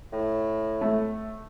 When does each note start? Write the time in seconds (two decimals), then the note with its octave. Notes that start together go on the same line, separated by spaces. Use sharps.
0.13 A2
0.81 A3